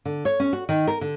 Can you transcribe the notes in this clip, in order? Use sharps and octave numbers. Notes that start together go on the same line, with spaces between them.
D3
C#5
C#4
F#4
D#3
A#4
D3